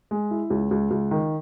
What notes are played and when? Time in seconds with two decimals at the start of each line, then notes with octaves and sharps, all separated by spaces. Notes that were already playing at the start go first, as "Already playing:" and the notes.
0.11 G#3
0.31 E4
0.50 C#2
0.71 C#2
0.91 C#2
1.11 D#3